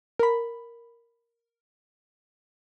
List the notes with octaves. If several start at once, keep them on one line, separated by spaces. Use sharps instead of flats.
A#4 B5